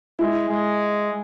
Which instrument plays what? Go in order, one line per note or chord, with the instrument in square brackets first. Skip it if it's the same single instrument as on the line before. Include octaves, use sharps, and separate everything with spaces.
[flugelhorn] G#3 [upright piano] E4
[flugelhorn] G#3